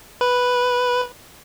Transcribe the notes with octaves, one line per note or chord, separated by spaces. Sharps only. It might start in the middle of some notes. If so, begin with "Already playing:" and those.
B4